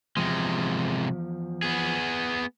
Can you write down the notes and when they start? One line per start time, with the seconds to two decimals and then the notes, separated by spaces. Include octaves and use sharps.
0.17 E2 C3 F3 G#3
1.63 B3 G#4